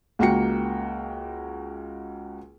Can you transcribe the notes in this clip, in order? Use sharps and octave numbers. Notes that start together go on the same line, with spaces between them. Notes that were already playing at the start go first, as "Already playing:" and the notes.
C#2 A#3 F#4 G5 C#7